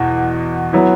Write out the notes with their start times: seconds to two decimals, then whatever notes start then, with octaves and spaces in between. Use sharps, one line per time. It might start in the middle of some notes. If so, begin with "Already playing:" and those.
Already playing: E2 B2
0.73 F#3 B3 E4